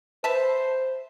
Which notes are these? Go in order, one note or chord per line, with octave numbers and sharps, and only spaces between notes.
B4 C5 E5 A5